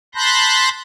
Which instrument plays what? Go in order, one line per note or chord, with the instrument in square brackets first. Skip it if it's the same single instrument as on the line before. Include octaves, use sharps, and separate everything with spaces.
[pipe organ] A5 B5 C6 F#6 G6 A#6